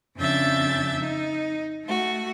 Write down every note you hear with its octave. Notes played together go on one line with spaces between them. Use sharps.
F2 C#3 D4 E5 G6 A6
D#4
A3 F#4